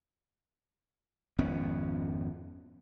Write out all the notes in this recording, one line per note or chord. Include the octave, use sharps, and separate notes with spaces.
G#1 F2 B3 C#4